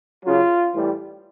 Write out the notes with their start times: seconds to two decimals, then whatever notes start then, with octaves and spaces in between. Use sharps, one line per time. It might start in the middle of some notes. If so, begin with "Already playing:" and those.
0.24 C#3 F#3 F4
0.73 A2 E3 G3